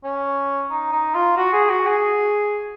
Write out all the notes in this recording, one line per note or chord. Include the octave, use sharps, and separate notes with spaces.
C#4
D#4
D#4
F4
F#4
G#4
F#4
G#4